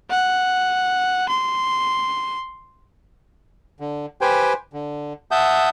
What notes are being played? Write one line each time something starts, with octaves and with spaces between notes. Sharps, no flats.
F#5
C6
D3
G4 B4 C5 G5 G#5
D3
E5 F#5 A5 D#6 G6